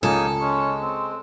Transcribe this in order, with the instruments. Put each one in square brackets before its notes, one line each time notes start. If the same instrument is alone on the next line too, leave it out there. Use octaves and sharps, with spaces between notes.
[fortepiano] C#2 [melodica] A#3 D#4 G#5 [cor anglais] G#4 [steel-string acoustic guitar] A4
[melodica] G#3 [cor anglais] C#4
[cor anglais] C4